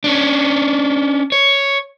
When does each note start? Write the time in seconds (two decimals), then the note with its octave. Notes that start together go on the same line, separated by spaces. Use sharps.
0.04 C#4 D4
1.32 C#5